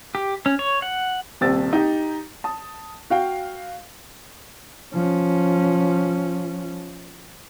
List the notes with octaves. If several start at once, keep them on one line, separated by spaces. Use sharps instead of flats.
G4
C#4
C#5
F#5
D#1 C2 C4 E6 A6
D#4 G4
A5 D#6
F#4 F5 G5
F3 C#4